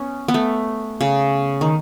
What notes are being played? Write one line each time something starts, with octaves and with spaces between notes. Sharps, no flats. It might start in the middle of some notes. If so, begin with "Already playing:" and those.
Already playing: B3 C#4
B3
A3
C#3
D#3